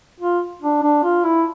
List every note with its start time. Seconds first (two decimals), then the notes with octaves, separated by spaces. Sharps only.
0.20 F4
0.62 D4
0.83 D4
1.03 F4
1.24 E4